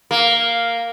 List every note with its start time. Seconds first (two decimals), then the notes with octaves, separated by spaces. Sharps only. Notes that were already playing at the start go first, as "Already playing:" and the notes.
0.11 A#3